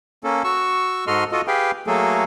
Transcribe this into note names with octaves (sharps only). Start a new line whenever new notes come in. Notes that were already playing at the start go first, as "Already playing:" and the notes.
A#3 C#4 A4
F#4 C#6 E6
G#2 F#4 A4 D#5 C6 F6
F4 F#4 A4 D#5
G4 G#4 B4 F5 G5
F#3 A3 A#3 G#4 A4